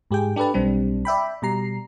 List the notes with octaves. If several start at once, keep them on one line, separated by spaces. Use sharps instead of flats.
G#2 G4 G#4 G5
D4 G4 A4 B4 A5
B1 G3 C4 D4
D5 E5 G5 B5
B2 G3 A#5 C7